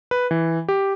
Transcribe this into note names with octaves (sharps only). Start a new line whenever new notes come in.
B4
E3
G4